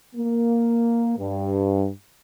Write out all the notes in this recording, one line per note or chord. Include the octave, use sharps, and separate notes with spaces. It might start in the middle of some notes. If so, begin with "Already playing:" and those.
A#3
G2